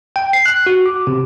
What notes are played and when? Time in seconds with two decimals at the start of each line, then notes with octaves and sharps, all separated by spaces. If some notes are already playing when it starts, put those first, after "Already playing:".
0.16 G5
0.33 C7
0.46 F#6
0.67 F#4
0.86 D6
1.07 C3